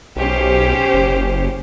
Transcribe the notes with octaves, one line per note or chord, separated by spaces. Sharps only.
B1 C#4 G4 C5
F#1